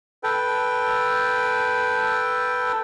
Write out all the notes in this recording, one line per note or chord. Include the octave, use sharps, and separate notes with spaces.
A4 B4 G5